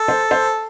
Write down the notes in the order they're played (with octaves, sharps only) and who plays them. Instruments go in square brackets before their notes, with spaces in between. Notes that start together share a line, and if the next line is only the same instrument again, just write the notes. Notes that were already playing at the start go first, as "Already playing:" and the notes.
Already playing: [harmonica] A4
[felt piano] C5
C5